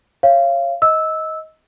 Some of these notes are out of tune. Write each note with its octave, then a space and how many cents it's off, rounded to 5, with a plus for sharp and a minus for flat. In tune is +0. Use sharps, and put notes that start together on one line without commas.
C#5 -20 F5 -25
D#5 +20 E6 -10